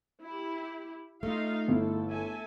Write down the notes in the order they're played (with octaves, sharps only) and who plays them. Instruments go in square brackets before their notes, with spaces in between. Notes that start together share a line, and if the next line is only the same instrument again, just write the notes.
[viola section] E4 G4
[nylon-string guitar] A3 [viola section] D#4 F4 F5
[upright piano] G1 E4 [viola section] A4
[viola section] A4 E5 G#5